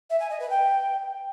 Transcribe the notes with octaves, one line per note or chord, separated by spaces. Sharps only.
E5
G#5
D#5
B4
G5